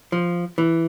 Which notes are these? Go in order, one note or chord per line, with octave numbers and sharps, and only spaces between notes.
F3
E3